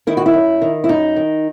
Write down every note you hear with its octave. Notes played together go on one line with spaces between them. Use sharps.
D#3 E4
F#4
E4
F#2
D#3
E4
F#2 D#4
D#3